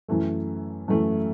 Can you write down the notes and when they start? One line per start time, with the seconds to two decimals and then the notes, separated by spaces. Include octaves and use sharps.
0.08 F#2 E3 A3
0.88 F#2 E3 A3